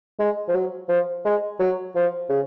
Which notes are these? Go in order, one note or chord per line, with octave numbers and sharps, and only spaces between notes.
G#3
F3
F#3
F3
G#3
F#3
F3
C#3